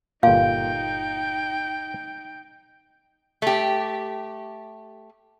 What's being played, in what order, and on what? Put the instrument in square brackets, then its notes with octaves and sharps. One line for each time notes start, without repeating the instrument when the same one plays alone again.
[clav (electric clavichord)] G1 A#2 [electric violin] D#4 G5 [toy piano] F5
[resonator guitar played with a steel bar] A3 G4